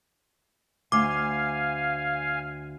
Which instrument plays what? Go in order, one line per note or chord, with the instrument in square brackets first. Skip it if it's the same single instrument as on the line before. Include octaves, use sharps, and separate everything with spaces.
[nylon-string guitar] D2 [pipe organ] F5 G#5 [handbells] D6